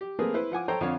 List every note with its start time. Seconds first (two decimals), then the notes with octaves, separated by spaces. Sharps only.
0.01 G4
0.19 A3 A#3 C4 G#4 A#4 B4
0.34 E4 B4 C5
0.52 F3 F#5 G#5 D6
0.68 A4 C5 C#5 G5 A#5
0.81 F2 D3 C#5 F5